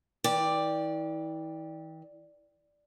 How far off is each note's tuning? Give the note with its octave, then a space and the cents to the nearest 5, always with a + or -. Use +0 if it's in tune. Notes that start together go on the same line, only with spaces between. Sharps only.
E3 -40 D5 +0 G5 +10